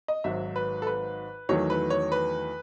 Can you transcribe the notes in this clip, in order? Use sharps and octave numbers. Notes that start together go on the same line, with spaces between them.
D#5
G#1 G#2 D#3 F#3 E5
B4
A4
B4
E2 D#3 F#3 A3 C#5
B4
C#5
B4